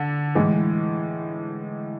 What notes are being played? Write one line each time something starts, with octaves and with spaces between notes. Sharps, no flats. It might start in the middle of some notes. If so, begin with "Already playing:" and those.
Already playing: D3
A2 E3 G#3